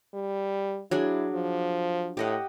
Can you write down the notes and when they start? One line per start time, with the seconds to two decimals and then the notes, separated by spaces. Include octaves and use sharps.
0.14 G3
0.91 F#3 D4 E4 G#4
1.34 F3
2.17 A2 G4 D#5 F#5